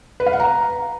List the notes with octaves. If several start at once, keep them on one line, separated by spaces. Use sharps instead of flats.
B4
F5
F#5
A#5